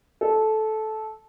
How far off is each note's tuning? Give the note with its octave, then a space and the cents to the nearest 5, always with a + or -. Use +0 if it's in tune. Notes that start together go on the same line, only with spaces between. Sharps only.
A4 -15